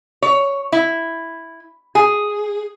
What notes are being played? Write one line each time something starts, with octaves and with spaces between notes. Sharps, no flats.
C#5
E4
G#4